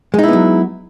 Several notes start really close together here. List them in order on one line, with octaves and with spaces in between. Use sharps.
G#3 D#4 E4 B3 F#3